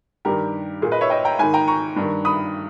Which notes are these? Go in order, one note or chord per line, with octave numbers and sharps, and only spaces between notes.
G2 D#3 G4 A#4
A#2 G#4
B4 D#5
C#5 E5
D#5 G5
G5 A#5
G#2 D#3 G#5 B5
G5 A#5
A#5 C#6
G2 D#3
B5 D#6